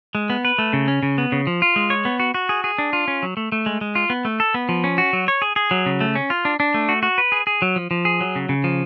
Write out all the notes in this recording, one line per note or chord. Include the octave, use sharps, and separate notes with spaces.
G#3
B3
B4
A3
C#3
C#4
C#3
B3
C#3
F3
F4
G#3
C#5
B3
F#4
F#4
G#4
G#4
D4
F4
C#4
F#3
A3
A3
G#3
G#3
F4
B3
A3
A4
B3
F3
C#4
F#4
F#3
C#5
G#4
G#4
F#3
C#3
A3
C#4
F4
D4
D4
A3
F#4
F#4
B4
G#4
G#4
F#3
F3
F3
G#4
F#3
C#3
C#3
F3